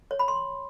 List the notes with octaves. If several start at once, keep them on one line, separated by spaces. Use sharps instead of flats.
C#5
B5
C6